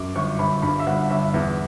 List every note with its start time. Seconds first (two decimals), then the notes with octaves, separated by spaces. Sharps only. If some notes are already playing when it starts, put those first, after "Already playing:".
Already playing: F#2 D6
0.15 G1 C#6
0.39 G1 B5
0.62 G2 B5
0.79 E5
0.86 G1 F#5
1.10 G1 E5
1.34 E2